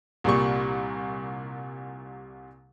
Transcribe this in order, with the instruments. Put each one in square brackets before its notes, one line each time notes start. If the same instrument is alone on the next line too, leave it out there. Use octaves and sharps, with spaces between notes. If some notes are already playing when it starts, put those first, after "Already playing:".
[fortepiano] C2 A#2 G3 C#6